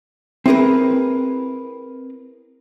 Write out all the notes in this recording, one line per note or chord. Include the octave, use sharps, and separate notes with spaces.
C4 E4 G#4 A#4 B4